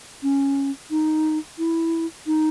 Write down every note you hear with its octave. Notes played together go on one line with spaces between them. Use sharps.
C#4
D#4
E4
D#4